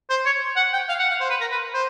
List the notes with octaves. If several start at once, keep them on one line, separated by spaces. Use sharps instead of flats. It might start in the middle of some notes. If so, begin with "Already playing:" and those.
C5
C#5
F#5
G5
F5
F#5
F5
C5
B4
A#4
B4
C5